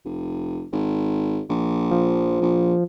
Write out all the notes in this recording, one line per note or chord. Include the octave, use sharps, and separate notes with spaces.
F1
G#1
A#1
F3
A#1